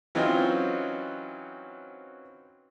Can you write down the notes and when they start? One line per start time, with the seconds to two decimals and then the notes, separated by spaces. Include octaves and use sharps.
0.15 E3 F#3 C4 C#4 D#4 F4